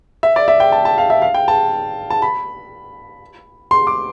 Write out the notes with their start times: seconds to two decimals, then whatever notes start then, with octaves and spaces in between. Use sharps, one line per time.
0.23 E5
0.36 D5
0.48 E5
0.60 G5
0.72 A5
0.85 A5
0.98 F5
1.10 E5
1.22 F5
1.34 G5
1.48 A5
2.10 A5
2.22 B5
3.71 C6
3.87 D6